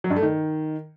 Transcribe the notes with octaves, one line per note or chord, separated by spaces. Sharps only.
F#3
G2
A3
D#3